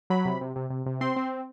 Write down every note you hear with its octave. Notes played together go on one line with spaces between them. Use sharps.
F#3 B5
C3
C3
C3
C3
C3
C4 C6
C4